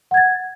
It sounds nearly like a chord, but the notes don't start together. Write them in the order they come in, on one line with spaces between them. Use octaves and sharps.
F#5 G#6 A6